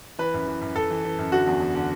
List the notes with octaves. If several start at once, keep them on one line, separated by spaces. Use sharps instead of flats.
E3 B4
F#2
E3
F#2
F#2 A4
E3
E3
F#2
D3 F#4
E2
E2
D3